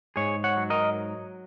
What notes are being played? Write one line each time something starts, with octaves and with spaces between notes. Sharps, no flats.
G#2 G#4 C#5
C#5 F#5
F#3
A#4 D#5